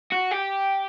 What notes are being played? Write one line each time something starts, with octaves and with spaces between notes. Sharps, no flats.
F#4
G4